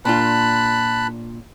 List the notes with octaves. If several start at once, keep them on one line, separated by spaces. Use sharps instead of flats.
A#2 D4 F4 A5 B5 F#6